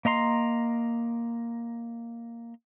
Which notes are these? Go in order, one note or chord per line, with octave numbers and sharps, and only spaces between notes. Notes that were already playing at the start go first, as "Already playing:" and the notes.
A#3 D#5 A#5 C6